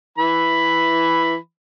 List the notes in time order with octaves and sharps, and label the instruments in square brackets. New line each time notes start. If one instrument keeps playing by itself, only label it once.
[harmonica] E3 B5